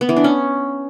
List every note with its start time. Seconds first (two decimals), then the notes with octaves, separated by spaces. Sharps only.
0.01 B3
0.09 E3
0.17 D4
0.24 C#4